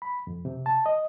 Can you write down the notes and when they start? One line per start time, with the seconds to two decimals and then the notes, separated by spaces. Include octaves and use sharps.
0.02 B5
0.27 F2
0.45 C3
0.66 A5
0.86 D#5